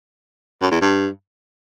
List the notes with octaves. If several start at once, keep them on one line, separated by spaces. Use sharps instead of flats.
F#2
E2
G2